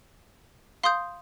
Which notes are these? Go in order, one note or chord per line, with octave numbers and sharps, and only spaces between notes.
F5 C6 D#6 G6